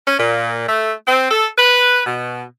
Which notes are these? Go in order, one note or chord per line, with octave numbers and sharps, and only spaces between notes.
C#4
A#2
A3
C4
A4
B4
B2